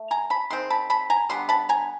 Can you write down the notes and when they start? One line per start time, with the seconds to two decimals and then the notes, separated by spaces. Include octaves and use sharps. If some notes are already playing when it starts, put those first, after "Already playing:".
Already playing: A3
0.11 G#5 A#5
0.30 A5 B5
0.50 D#3 G#3 C4 C6
0.70 A5 B5
0.90 A5 B5
1.10 G#5 A#5
1.29 D3 G3 B3 C6
1.49 A5 B5
1.69 G#5 A#5